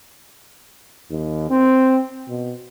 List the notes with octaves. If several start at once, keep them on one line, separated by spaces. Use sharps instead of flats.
D#2
C4
B2